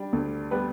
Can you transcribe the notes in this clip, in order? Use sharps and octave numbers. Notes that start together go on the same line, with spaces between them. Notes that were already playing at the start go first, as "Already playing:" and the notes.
Already playing: G3 D4
D2
G3 B3 B4